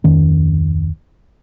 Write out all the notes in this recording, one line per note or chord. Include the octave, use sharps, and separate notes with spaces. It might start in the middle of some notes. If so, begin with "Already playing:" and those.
D1 F2 D#3 C#4